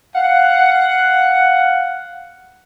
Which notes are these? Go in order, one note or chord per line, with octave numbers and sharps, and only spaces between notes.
F5 F#5